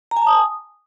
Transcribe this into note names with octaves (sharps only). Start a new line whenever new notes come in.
A#5
G#5
A5
D#6